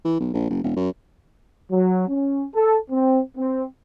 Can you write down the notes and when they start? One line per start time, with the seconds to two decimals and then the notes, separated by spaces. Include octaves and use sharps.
0.05 E3
0.20 B1
0.34 A#1
0.50 F#1
0.63 E1
0.76 F#2
1.71 F#3
2.08 C#4
2.55 A4
2.90 C4
3.37 C4